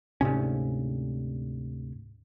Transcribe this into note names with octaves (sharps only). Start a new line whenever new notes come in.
D2 G#2 C3 C#4